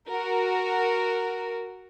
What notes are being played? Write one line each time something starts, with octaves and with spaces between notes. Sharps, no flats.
F#4 A#4